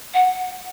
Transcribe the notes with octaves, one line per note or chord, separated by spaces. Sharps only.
F#5